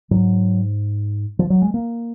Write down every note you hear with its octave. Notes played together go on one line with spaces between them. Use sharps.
G#2 F#3
F3
F#3
G#3
A#3